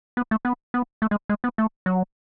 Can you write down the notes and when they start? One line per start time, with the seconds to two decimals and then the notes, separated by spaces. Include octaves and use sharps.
0.17 B3
0.31 A3
0.45 B3
0.74 B3
1.02 A3
1.11 G#3
1.29 G#3
1.44 B3
1.58 A3
1.86 F#3